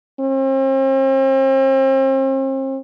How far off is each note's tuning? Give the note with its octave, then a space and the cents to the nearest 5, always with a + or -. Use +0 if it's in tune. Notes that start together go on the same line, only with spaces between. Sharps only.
C4 +40